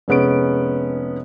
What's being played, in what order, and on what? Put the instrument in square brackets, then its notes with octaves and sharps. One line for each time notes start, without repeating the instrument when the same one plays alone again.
[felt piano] F1 G#3 B3 C#4 D7